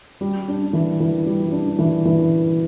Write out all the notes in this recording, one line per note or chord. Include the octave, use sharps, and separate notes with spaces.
G3
D4
E3
E3
G3
D4
E3
E3